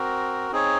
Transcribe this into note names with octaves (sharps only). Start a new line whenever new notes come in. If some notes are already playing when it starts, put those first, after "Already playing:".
Already playing: C4 F#4 A#4
C4 D#4 G#4 C#5